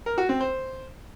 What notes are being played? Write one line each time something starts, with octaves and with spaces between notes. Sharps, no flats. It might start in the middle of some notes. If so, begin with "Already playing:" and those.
A#4
F#4
C4
C5